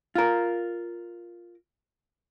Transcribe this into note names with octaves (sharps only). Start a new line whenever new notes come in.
F4 A#4